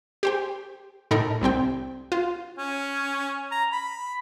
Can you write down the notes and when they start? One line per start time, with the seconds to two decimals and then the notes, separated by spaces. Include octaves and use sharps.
0.23 G4 C5 G5
1.11 A2 D#4 A4 A#4 A#5
1.42 C2 G3 C4 G5
2.12 F4
2.58 C#4
3.52 A#5
3.73 B5